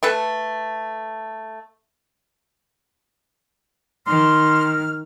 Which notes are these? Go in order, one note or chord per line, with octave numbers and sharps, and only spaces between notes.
A3 A4 B4
D#3 C6 F6